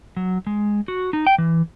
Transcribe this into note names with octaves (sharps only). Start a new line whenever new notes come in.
F#3
G#3
F#4
D#4
G5
E3